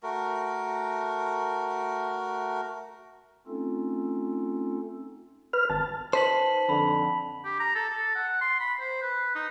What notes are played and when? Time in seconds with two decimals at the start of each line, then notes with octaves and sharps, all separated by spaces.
0.03 A3 F#4 A#4
3.47 A3 C4 C#4 D#4 F4 A4
5.53 B4 F6
5.70 G#1 A5
6.13 D#4 B4 C5 A5 B6 F#7
6.69 F2 D3 B5
7.44 G4
7.60 A#5
7.75 A4
7.90 A4
8.15 F#5
8.41 C6
8.60 B5
8.80 C5
9.02 B4
9.35 D#4